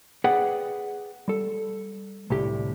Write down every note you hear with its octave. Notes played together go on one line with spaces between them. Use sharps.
G#4 B4 D5 F#5 G5
G3 A4
C2 A2 D3 G4